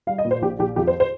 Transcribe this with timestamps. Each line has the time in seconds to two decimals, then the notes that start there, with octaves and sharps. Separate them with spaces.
0.07 G3 F5
0.18 D#5
0.25 A#2
0.31 C5
0.42 A#1 G4
0.59 A#1 G4
0.76 F2 G4
0.87 C5
1.00 C5